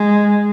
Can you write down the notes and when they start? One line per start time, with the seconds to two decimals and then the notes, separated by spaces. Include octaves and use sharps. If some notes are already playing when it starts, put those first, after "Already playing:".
Already playing: G#3